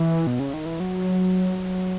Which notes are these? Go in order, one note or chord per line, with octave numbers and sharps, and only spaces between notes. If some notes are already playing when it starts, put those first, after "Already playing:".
Already playing: E3
B2
C#3
D#3
E3
F#3